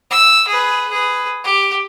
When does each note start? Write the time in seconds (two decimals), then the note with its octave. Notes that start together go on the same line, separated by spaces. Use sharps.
0.10 E6
0.48 G#4 B4
0.90 G#4 B4
1.44 G4